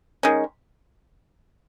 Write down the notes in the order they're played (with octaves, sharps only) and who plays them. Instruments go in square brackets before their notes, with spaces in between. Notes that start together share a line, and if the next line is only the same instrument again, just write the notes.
[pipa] D#3 G#3 C#4